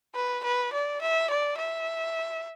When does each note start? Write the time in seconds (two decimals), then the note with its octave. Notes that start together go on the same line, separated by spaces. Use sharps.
0.15 B4
0.44 B4
0.73 D5
1.01 E5
1.30 D5
1.58 E5